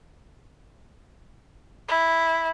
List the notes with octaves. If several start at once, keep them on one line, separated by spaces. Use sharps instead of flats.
E4